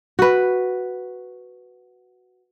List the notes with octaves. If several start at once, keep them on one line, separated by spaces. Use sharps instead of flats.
F#4 B4